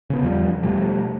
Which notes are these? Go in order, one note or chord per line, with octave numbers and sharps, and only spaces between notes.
C#3 B3
E2 F3 G3
B2 F3 G3 A3